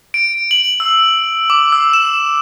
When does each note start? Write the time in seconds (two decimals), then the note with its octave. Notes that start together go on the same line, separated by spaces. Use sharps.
0.14 D7
0.51 F#7
0.80 E6
1.50 D6
1.72 E6
1.93 E7